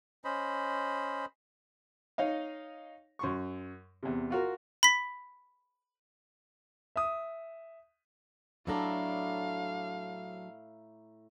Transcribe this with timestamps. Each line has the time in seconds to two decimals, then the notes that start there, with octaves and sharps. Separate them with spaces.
0.25 C#4 C5 D#5 B5
2.18 D#4 C#5 D#5 F5
3.19 F#2 C6 C#6
4.03 E2 C3
4.30 F4 F#4 A#4
4.83 B5 B6
6.96 E5 D#6
8.67 A2 F#3 D4 A4 F5 A#5 D6